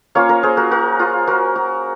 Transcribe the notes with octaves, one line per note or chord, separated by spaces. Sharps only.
A#3 C#4 F4 C#5 F5
A#4 C#5
G#4 C5
F#4 A#4
F#4 A#4
F4 G#4
F#4 A#4
F#4